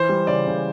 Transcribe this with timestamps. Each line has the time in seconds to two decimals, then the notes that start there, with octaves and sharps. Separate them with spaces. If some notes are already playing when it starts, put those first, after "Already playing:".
Already playing: E3 C5
0.09 G3
0.27 C#3 D5
0.47 C#3